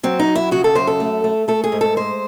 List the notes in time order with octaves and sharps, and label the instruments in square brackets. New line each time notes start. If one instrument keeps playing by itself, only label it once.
[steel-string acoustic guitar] F#3 C4
D#4
F#2
E4
C#3 F#4
A4
F#2 C5
A4
A3
A3
A3 A4
G#4
G#2
A4
G#3 C5